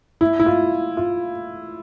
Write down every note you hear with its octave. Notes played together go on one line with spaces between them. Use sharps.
E4
E4
F4
F4